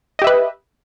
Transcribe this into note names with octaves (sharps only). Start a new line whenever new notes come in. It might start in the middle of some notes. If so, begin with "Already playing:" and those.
G4 B4 D#5 E5